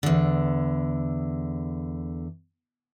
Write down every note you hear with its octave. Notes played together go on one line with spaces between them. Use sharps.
E2 D3